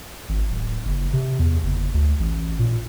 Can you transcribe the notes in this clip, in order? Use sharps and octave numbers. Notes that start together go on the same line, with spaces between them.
G#1
D1
F#1
C3
E2
F#1
D2
A1
A#2